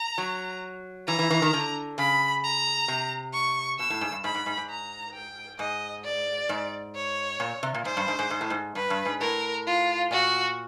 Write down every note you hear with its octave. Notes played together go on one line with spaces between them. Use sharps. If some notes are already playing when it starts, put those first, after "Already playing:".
Already playing: A#5
F#3
E3 A#5
E3
E3
D#3
D3
C#3 B5
A#5
C3
C#6
B2 E6
A2
G#2
G2
G#2 B5
G#2
G#2
G#2
A#5
G5
G#2 D#5
D5
G#2
C#5
A#2
C3
A#2
G#2 C5
G2
G#2
G#2
G#2
A2
G#2
G2 B4
G2
G#2
A2 A#4
F4
A#2 F#4